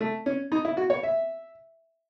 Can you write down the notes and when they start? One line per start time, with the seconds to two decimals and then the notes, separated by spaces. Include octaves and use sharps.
0.01 A3
0.26 C#4
0.52 D#4
0.65 E4
0.77 F#4
0.90 C#5
1.03 E5